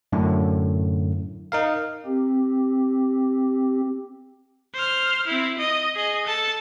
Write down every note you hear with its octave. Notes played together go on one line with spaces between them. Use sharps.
F#2 A2 D3
D#4 A#4 F5
C4 G4
C5 F6
C4 E4
D#5
G#4 D#5
A4 A5